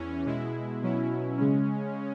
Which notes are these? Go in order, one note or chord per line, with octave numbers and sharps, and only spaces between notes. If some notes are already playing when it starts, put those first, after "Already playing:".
Already playing: E2 E3 C#4
B2 G#3 E4
B2 F#3 C#4 E4
C#3 G#3 C#4